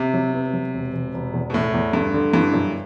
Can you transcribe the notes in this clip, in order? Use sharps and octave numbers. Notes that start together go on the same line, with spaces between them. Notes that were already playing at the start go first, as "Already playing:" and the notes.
Already playing: C3
F#3
B3
F#3
E1
E1
E1
E2
B2
E2 A2
E2
G2 D3
D3
G2 E3
F#2